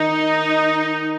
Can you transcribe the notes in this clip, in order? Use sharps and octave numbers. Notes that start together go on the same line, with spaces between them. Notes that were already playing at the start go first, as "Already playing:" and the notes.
Already playing: D#3 D#4